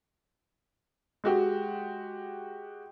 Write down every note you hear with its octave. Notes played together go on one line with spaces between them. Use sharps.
G#3 F#4 G4